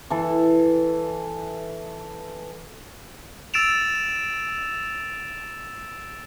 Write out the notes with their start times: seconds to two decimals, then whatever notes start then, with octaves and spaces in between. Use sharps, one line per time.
0.10 E3 A4
3.54 E6 A6 D7 E7 F7